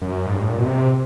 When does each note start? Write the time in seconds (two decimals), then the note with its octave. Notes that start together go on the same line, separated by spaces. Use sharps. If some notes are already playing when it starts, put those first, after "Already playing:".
0.02 F#2
0.26 G#2
0.34 G2
0.42 A2
0.50 A#2
0.58 B2
0.66 C3